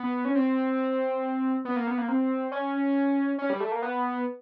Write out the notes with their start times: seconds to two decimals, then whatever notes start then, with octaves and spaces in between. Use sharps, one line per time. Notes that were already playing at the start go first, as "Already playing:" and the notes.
Already playing: B3
0.25 C#4
0.35 C4
1.65 B3
1.76 A#3
1.87 B3
1.98 A#3
2.08 C4
2.52 C#4
3.38 C#4
3.50 G3
3.60 A3
3.72 A#3
3.82 B3